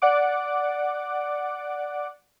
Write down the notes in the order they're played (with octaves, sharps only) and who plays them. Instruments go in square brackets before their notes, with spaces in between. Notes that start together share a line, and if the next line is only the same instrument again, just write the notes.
[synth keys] D5 F#5 D6